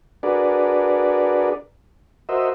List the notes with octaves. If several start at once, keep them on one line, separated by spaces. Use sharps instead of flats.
D4 F#4 G#4 A#4 B4 D5
F#4 A#4 C5 D#5 E5